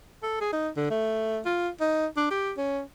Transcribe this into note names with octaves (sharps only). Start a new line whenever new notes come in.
A4
G#4
D#4
D3
A3
F4
D#4
D4
G4
C#4